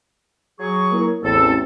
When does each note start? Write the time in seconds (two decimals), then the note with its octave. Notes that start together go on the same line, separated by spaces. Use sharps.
0.59 F#3 G#4 C#6
0.92 A#3 E4 A#4
1.23 A1 E2 C4 A4